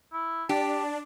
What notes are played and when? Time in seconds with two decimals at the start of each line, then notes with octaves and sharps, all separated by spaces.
0.13 E4
0.49 D4 G4 A5